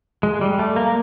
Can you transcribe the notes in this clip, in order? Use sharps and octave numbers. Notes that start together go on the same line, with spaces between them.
G#3
G3
A3
A#3